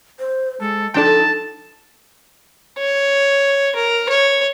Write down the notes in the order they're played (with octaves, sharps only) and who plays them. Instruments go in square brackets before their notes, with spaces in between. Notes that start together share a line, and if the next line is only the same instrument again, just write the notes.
[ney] C5
[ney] G#3 [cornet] A4
[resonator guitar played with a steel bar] F3 A4 [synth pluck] D4 G5 [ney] D#4 [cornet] A5
[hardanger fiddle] C#5
A#4
C#5